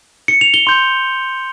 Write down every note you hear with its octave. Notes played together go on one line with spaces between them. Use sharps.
C#7
F7
G7
C6 G6